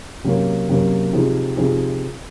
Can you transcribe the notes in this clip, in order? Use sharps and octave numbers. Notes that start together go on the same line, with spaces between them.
C3 F#3 A#3 C#4
C3 F#3 A#3 C#4
C3 F3 C4 D#4 G#4
C3 F3 C4 D#4 G#4